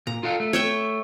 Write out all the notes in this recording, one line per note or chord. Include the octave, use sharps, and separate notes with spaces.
A#2 A#5
F4 A4 F5
A3
C#5 E5 G5